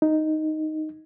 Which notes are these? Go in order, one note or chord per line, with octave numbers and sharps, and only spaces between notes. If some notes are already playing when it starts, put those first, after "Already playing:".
D#4